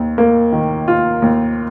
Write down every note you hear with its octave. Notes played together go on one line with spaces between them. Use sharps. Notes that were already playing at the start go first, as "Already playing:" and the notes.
Already playing: D#2
A#3
D#3
F4
D#2